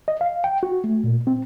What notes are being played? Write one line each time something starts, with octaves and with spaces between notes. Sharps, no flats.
D#5
F5
G5
F#4
A3
A#2
C4